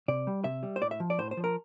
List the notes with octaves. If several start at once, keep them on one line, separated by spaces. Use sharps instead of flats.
C3 D5
G3
C3 E5
G3
C5
A2 D5
E5
F3
D5
A2 C5
C5
F3
A#4